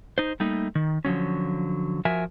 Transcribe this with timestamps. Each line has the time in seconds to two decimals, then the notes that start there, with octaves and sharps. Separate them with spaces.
0.18 D#4 C5
0.40 G3 A3 A#3 D#4
0.75 D#3
1.05 D3 F3 F#3 C#4
2.05 F3 F#4 A#4 E5 G#5